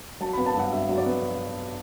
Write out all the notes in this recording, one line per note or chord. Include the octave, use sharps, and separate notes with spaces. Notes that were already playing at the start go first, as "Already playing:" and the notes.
F#3 A5
B5
B3
A5
G2 F#5
G2 E5
F#3
D5
B3